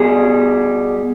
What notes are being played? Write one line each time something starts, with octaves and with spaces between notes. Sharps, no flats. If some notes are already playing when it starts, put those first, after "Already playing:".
Already playing: B2 G3 G#4